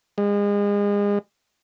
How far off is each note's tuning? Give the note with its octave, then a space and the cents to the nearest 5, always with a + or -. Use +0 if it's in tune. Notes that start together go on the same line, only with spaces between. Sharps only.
G#3 -35